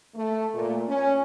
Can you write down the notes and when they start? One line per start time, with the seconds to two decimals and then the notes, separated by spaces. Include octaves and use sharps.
0.15 A3
0.54 A#2
0.88 C#4